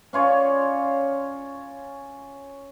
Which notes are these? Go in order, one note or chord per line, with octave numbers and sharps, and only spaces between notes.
C#4 F4 C#5 D5